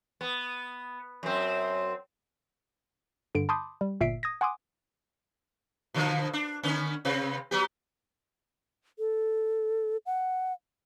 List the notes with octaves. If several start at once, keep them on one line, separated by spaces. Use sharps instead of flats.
B3
F#2 C4
G2 D3 D7
A5 B5 C6 D6 D#6 G6
G3
G1 A#2 E5 B6 C7 D7
D#6 G#6 A#6
F#5 G#5 C6 D6 D#6
B2 D3 F3
D4
D3 B3 C#4
C3 C4 B4
F#3 B3 G4
A4
F#5